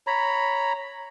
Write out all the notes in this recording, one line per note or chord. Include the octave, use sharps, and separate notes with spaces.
C#5 A#5 B5